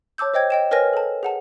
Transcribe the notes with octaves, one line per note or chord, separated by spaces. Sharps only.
C#5 A5 D6 E6 G6
C5 D#5 G5 G#6
D#5 G5 E7
A#4 B4 C#5 G#5 F6 A#6
A4 A5
G#4 F#5 A5